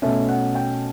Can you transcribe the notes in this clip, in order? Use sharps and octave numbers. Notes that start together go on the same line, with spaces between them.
B2 A3 C#4 E5
F#5
G5